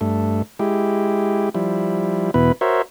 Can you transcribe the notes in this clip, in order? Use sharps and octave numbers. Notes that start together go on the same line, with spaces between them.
G2 A3
G#3 E4 G4
F3 G3 E4
E2 B2 E4 B4
F#4 A#4 C5 C#5 E5